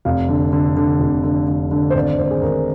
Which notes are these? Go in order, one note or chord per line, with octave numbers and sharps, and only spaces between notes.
F1 F5
D3
D3
D3
F1
D3
D3
D3
C5
G#1 D5
G#1 C5
G#4
G#1 A#4